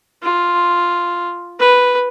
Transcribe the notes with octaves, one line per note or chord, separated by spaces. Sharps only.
F4
B4